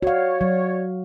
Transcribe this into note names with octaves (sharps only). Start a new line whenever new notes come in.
F#4 C#5 D5 F5
F#3